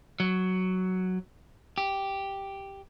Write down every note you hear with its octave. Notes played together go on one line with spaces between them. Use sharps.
F#3
G4